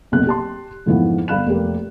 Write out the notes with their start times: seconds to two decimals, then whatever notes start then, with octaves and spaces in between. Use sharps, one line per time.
0.12 F#1 B1 C3 F#6
0.27 G4 A5 C6
0.86 F2 G#2 E3 F3 B3
1.28 G1 F5 B5 F#6 E7
1.47 F1 A#3 G4